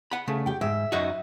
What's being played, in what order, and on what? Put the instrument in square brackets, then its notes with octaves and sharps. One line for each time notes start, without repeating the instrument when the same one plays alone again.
[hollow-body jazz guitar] F#5 B5
C#3 A3
[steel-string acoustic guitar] G4 G5
[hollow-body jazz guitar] G#2 [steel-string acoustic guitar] E5
[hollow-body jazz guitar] F#2 D#4 F#4